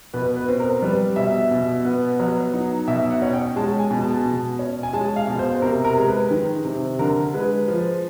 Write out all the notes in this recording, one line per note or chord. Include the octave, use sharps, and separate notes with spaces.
B2 B4
B4
C4
A#4
G3 B4
B2 E5
B2
B3
F#3
D#4
B2 E5
F#5
C#4
G5
G#3 A5
G#5
B2
A5
B2
C#4
G#5
G#3 A5
F5
B2
C5
C3 A#4
A#4
G#3
B4
D#3
C3
D3 A#4
G#3 B4
F3